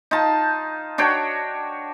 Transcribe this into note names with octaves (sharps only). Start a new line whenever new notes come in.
D#4 F4 A5
D4 F#4 C#5 G5